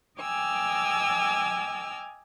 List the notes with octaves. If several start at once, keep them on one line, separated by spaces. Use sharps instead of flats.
D#5 G5 G#5 D6 E6 F6